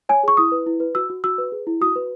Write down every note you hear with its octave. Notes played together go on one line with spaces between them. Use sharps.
C#5 G#5
G#4 C#6
E4 D#6
B4
E4
B4
F#4 E6
F#4
F#4 E6
B4
G#4
E4
F#4 D#6
B4